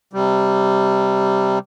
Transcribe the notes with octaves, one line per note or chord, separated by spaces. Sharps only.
C3 G3